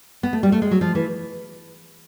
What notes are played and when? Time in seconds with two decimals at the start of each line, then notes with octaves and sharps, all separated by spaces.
0.23 B3
0.33 A3
0.43 G3
0.52 A3
0.62 G#3
0.71 F#3
0.81 F3
0.95 E3